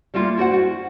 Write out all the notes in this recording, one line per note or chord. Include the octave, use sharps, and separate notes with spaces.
G3 A3 A#3 F4
E4 F#4 C5 F#5
F#4